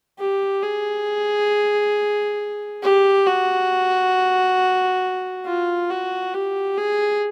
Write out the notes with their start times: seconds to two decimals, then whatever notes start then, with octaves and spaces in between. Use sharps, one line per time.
0.19 G4
0.63 G#4
2.83 G4
3.27 F#4
5.46 F4
5.90 F#4
6.34 G4
6.78 G#4